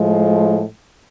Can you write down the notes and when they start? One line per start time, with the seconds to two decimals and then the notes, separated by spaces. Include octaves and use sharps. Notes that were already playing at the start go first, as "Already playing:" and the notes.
Already playing: A2 F3 G#3